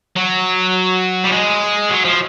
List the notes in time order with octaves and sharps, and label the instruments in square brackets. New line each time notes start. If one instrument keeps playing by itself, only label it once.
[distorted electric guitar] F#3
G3
G#3
F#3
F3